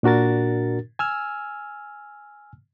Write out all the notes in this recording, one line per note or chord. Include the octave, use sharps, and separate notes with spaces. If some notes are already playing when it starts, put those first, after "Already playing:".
A#2 D4 F#4 A#4 A6
G#5 E6 F6